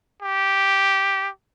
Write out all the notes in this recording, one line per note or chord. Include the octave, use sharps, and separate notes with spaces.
G4